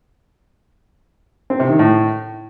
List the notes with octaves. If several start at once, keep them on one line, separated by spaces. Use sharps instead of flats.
C4
C3
D#3
A2